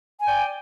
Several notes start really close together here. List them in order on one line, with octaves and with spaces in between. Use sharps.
G#5 G5 D5